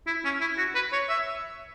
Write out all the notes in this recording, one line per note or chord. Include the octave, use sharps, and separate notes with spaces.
E4
C#4
E4
F#4
B4
C#5
E5